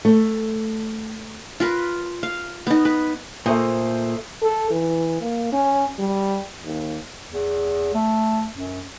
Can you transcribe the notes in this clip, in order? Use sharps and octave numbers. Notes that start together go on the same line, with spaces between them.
A3
F4 A#4 B4
F5
B3 D#4
B4
A#2 A3 C5 D#5
A4
E3
A#3
C#4
G3
D#2
E2
A3
F#2